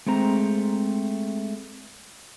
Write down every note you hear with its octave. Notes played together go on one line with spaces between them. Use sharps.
G#3 A3 C4 A#5